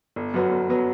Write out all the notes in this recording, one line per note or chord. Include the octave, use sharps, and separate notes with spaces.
G1
F#2 F#3 B3
G1
F#3 B3